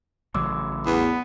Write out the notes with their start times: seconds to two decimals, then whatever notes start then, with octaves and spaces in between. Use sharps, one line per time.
0.34 A1 C#3 F#3 C6 D6 E6
0.86 E2 B3